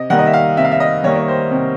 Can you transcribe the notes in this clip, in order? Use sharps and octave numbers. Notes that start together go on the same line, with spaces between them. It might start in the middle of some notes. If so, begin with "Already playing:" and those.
Already playing: C3 D#5
D#3 G3 A#3 F#5
D#5
E5
F5
C3 E5
F5
E5
D#5
D#3 G3 A#3 C#5
C#5
C5
C3